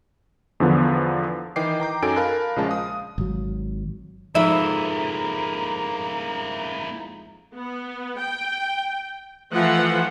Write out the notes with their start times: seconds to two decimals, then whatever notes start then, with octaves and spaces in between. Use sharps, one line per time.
0.60 E2 D3 F3 B3
1.56 D#3 E3 D#5 G5 D6 C7
1.80 G5 A#5 D6 G6
2.02 F#2 F#3 D#4 A4 G#5 D7
2.16 A#4 F5 A5 B5 F#6
2.56 A#1 C#3 F3 G#3 A5
2.69 F5 D#6
3.18 G#1 F#3
4.35 F2 G#2 A#3 E4 E5 A#5 B5
7.54 B3
8.18 G5
9.53 E3 F3 A3 F#5